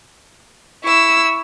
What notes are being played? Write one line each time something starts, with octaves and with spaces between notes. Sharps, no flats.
E4 C#6 E6